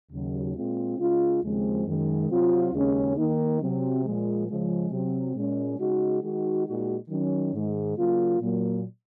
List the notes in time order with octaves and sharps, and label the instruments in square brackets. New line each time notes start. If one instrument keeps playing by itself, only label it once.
[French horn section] D#2 C#3 F#3
A#2 G#3 C4 F4
C#3 G#3 C#4 F4
D#2 C#3 F3 G#3 C4
F#2 D#3 G#3
C3 F#3 C4 F4
D#2 C#3 G#3 C#4
D#3 A#3 D#4
C3 F#3 C4
A#2 F3 G#3
C#3 F3 G#3
C3 F#3 C4
A#2 G#3 C#4
C#3 G#3 D#4 F#4
D#3 G#3 D#4 F#4
A#2 G#3 D#4 F#4
D#3 F#3 C#4
G#2 D#3 G#3
C#3 F#3 A#3 F4
A#2 F#3 A#3